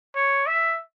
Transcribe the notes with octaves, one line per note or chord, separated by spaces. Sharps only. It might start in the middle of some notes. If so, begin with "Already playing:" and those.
C#5
E5